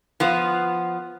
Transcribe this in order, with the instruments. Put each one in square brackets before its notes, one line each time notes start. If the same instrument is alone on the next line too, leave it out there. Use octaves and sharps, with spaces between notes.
[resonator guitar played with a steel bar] F3 B3